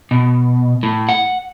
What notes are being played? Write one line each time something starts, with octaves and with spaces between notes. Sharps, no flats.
B2
A2
F#5